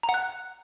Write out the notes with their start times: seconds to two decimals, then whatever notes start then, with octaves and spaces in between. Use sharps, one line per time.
0.03 A#5
0.09 F#5
0.14 F#6